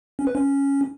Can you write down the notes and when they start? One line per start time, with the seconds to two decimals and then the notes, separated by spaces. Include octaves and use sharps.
0.19 C#4
0.27 B4
0.35 C#4